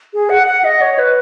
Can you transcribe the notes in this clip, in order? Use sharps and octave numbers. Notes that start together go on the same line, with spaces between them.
G#4
F#5
F#5
D#5
C#5
B4